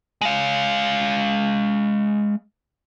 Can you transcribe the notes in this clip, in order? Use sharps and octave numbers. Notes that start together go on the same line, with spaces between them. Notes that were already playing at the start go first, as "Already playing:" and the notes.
G#3 F5